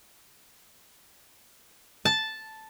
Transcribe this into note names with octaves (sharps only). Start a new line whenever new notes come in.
A5